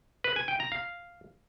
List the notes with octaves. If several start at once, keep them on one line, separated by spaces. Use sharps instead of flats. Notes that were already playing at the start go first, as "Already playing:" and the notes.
B4
G#5
G5
A#5
F5